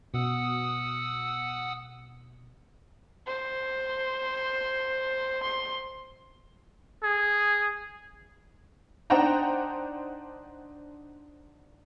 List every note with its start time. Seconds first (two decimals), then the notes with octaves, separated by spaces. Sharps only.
0.14 B2 F#5 D#6 E6
3.26 C5
5.43 C6
7.03 G#4
9.10 D4 D#4 C5 F#5 G5 A#5